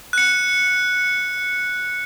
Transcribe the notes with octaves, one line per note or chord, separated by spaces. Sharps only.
F#6 C#7